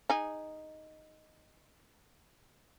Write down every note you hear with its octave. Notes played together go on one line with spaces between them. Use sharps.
D#4 G#4